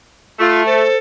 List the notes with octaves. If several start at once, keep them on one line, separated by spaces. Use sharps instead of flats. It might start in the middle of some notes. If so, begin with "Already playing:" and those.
A3 F4
A4 C5